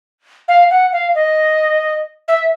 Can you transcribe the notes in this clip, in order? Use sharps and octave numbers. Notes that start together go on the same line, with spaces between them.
F5
F#5
F5
D#5
E5